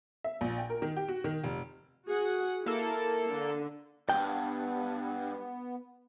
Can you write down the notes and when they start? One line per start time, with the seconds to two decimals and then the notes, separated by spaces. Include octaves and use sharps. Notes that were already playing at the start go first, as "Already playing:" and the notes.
0.24 E5
0.41 A#1
0.58 G5
0.70 A#4
0.82 D#3
0.97 G4
1.08 F#4
1.24 D#3
1.44 F1
2.08 F#4 G#4 F#5
2.66 A#3 E4 A4
3.29 D3
4.09 D2 G2 B3 G5